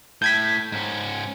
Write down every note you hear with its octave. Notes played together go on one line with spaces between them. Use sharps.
A2 G6 G#6 B6
G#2 C#4